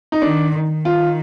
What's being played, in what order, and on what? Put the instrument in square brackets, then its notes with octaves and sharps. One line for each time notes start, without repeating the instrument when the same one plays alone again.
[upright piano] D#4
[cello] D#3 [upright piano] D4
[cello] D#3
[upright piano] F4